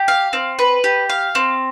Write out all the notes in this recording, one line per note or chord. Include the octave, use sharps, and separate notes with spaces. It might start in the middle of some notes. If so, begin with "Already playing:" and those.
Already playing: G4
F5
C4
B4
G4
F5
C4